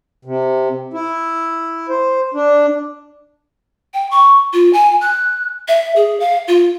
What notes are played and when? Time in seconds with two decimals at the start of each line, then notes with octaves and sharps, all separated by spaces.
0.25 C3
0.94 E4
1.89 C5
2.34 D4
3.94 G5
4.11 C#6
4.53 F4
4.73 G#5
5.01 F#6
5.68 E5
5.96 G#4
6.20 F5
6.48 F4